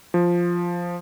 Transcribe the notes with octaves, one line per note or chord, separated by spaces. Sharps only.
F3